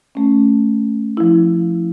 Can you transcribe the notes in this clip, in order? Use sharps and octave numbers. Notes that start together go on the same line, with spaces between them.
A3 C#4
F3 E4